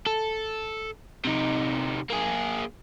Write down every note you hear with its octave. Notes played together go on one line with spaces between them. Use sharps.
A4
C3 D#4
A#3 G#4